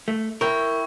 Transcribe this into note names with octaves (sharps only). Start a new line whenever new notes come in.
A3
E4 A#4 G5 C#6